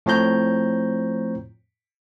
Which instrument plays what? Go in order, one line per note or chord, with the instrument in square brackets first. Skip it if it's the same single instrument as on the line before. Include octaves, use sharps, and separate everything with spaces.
[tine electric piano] A2 F3 C4 C#5 A#5 G6